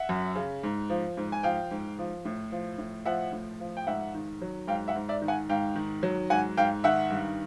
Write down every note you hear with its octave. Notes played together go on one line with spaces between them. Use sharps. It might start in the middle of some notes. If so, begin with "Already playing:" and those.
Already playing: E5 F#5
F#2
C#3
G#2
F3
G#2
G#5
F3 F5 G5
G#2
F3
A2
F3
A2
F3 E5 F#5
A2
F3
G5
G#2 E5 F#5
D#3
F#3
G#2 F5 G5
E5 F#5
G#2
D5 E5
D#3
F#5 G#5
G#2 F5 G5
D#3
F#3
G#2 F#5 G#5
G#2 F5 G5
D#3 E5 F#5
G2